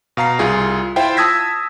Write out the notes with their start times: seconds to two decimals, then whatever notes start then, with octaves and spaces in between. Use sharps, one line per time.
0.17 B2 F5 A#5 C7
0.39 C2 F4 G#4
0.96 E4 F4 C5 E5 G5
1.17 A5 D#6 E6 G#6 A#6 B6